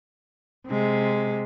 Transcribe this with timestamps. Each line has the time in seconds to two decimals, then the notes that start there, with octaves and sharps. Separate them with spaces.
0.67 C3 G#3